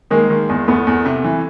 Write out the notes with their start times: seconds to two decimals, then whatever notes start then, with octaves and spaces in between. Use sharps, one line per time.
0.11 D#3 G#3 A#3
0.30 D#3
0.49 E2
0.68 E2 A3 B3
0.87 E2
1.06 C3
1.24 E3